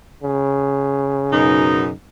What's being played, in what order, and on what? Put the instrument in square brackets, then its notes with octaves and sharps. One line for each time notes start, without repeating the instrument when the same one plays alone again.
[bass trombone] C#3
[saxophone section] F#2 B2 D#4